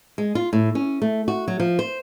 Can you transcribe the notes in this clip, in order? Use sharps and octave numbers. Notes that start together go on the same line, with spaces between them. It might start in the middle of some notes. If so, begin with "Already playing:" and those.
G#3
F4
A2
C#4
A3
F#4
F#3
F3
C5